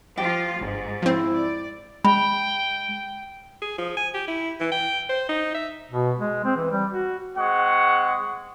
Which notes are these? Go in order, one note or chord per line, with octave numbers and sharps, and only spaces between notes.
F3 F4 G4
G1 G#2
F3 C4 E4
D5
G#3 G5 B5
G#4
F3
G#5
G4
E4
E3
G5
C5
D#4
E5
B2
G#3
C4
E3
G3
F#4
G#3 C4 F#5 C#6